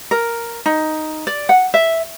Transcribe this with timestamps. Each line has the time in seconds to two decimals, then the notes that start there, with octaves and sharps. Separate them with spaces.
0.11 A#4
0.66 D#4
1.27 D5
1.49 F#5
1.74 E5